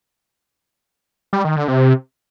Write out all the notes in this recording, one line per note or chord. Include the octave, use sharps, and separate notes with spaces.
G3
D#3
D3
C3